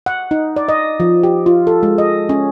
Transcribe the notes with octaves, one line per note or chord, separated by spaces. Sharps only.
F#5
D#4
D5
D#5
F3
G4
F4
A4
G#3
D#5
C#4